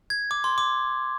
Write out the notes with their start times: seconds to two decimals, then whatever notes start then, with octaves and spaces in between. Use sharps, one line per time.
0.10 G#6
0.31 D6
0.44 C6
0.58 D6